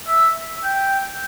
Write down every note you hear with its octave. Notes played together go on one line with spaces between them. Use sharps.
E5
G5